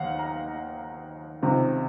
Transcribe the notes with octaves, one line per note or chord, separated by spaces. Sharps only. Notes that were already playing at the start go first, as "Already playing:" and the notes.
Already playing: D#2 D#3 F5 F#5
A#5
C#2 C3 D#3